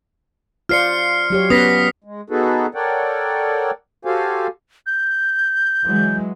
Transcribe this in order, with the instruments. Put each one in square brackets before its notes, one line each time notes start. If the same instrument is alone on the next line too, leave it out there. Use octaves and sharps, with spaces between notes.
[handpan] F4 C5 D5 [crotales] F6 C7 C#7
[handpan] F#3 G4 C#5
[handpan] B3 C#4 B4 [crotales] D#6 A#6 B6
[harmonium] G#3
B3 D#4 F#4 G#4 A4 B4
A4 A#4 C#5 D5 F#5 G5
F#4 G4 A4 C5 F5 G#5
[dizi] G6
[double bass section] E3 F#3 G#3